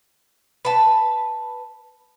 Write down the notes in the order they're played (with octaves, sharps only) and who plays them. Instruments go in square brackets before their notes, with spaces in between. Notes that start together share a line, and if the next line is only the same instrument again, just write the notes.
[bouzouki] B4 A5